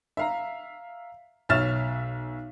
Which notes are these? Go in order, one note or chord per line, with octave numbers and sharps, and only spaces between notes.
E5 F5 A#5
B1 C#5 E5 F6 A6 E7